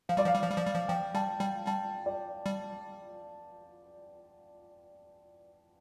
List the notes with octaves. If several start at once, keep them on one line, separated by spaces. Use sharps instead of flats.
F3 F5
G3 D5
F3 F5
G3
F3
G3
F3
G3
F3
F3 G5
G3 A5
G3 G5
G3 A5
D5
G3